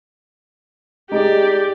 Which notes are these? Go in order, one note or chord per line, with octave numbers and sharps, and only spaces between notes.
G#3 D#4 G4 D5